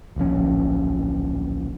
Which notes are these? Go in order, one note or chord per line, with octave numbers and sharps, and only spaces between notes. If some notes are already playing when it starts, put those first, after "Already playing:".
D1 A#1 F3 C#4